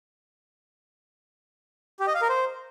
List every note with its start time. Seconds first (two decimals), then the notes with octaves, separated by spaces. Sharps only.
2.00 G4
2.07 D#5
2.15 F5
2.22 A#4
2.29 C5